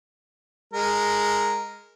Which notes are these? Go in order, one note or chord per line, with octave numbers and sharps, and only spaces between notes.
G#3 A#4